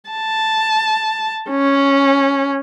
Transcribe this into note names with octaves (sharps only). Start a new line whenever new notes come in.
A5
C#4